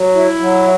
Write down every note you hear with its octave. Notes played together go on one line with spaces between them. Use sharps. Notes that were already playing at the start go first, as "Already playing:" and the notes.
Already playing: F#3
E4
F#3